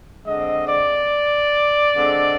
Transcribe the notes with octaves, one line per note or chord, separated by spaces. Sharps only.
D3 G#3 C4 D#5
D5
D3 G#3 C4